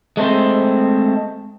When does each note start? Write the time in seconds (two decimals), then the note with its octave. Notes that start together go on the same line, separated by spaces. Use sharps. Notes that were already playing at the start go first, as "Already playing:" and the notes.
0.17 G#3 A3 C4 C5